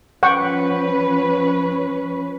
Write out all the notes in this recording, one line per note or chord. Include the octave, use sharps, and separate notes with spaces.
F3 C#4 B4 F#5 G5 C#6